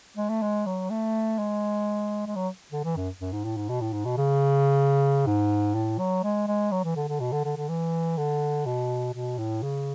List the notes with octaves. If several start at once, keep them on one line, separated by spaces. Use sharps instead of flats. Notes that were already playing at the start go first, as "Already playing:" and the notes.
G#3
A3
G#3
F#3
A3
G#3
G#3
F#3
D3
E3
F#2
F#2
G#2
A2
G#2
B2
A2
G#2
B2
C#3
G#2
A2
F#3
G#3
G#3
F#3
E3
D3
D3
B2
D3
D3
D3
E3
D3
B2
B2
A2
C#3